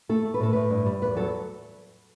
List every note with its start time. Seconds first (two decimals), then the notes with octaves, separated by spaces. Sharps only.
0.09 A3 A4
0.25 A3
0.34 B4
0.40 A2 A4
0.53 A2 B4
0.70 G2
0.86 G3
1.02 E2 B4
1.16 F#3 A4